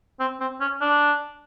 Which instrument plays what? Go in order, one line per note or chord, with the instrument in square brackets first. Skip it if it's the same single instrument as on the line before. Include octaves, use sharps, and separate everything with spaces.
[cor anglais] C4
C4
C#4
D4